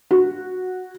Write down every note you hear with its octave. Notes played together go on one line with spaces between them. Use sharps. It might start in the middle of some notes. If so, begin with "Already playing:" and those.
F#4